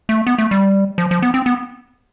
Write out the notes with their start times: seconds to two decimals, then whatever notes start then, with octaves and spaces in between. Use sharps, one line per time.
0.09 A3
0.27 B3
0.38 A3
0.51 G3
0.98 F3
1.11 F3
1.22 B3
1.34 C4
1.46 B3